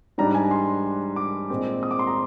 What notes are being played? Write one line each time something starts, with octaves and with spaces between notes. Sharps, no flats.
G#2 G3 D4 A#5
G#5
C6
D6
A#2 G#3 C4
D#6
D6
C6
A#5